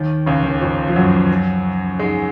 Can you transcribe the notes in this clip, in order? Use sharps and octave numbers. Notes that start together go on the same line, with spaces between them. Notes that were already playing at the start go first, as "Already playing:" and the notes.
Already playing: D#2 D#3
C#2 C#3
D#2 D#3
F2 F3
F3
F#2 F#3
G#2 G#3